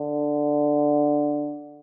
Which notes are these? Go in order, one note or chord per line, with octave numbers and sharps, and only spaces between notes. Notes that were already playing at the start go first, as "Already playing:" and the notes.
Already playing: D3